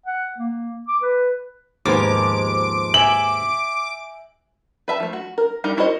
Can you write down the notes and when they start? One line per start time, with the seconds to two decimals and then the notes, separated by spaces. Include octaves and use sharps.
0.06 F#5
0.38 A#3
0.88 D6
1.02 B4
1.86 D#2 G#2 F3 G#3 B3 A#4 D6
2.94 E5 G#5 F#7
4.88 B4 E5 A5
5.00 F3 A3
5.13 F#4
5.38 A#4
5.64 G3 D#4 G4 A#4
5.77 E4 F#4 A#4 C5 D#5